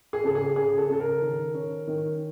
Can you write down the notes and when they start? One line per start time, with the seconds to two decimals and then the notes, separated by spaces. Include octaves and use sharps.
0.13 G#4
0.24 C#3 A4
0.35 G#4
0.56 C#3 G#4
0.78 A4
0.89 C#3 A4
1.00 A#4
1.22 D#3
1.55 C#4
1.87 D#3